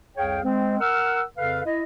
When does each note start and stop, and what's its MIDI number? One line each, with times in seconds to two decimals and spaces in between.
0.17 0.40 36
0.17 0.40 41
0.17 0.40 68
0.17 0.40 73
0.17 0.40 77
0.17 0.40 79
0.44 0.79 56
0.44 0.79 60
0.80 1.22 70
0.80 1.22 78
0.80 1.22 88
0.80 1.22 89
1.38 1.61 41
1.38 1.61 49
1.38 1.61 69
1.38 1.61 71
1.38 1.61 77
1.66 1.83 64
1.66 1.83 75